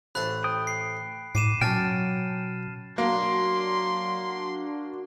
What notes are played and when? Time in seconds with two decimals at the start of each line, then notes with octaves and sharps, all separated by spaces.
0.15 A1 A3 C5 B5 F#6
0.44 G5 D#6
0.67 C7
1.35 A2 D6 C7 D#7 E7
1.61 B2 F#3 C#4 G5 A5 F6 A6
2.98 F#3 A#3 D4 F#4 C6